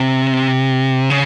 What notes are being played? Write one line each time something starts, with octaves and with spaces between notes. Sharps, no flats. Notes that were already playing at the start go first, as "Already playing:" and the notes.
Already playing: C3
C#3